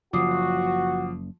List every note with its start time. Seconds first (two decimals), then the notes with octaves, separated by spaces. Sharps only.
0.13 F#1 F3 F#4 D6 D#6 C7